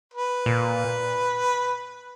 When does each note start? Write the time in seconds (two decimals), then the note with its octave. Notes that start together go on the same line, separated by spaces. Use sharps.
0.14 B4
0.46 A#2